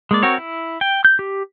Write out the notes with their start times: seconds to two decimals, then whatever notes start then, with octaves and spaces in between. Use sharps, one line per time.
0.11 G#3 A#3 D5
0.23 C4 F#4 A#4 C#5
0.38 E4
0.81 G5
1.05 G6
1.19 G4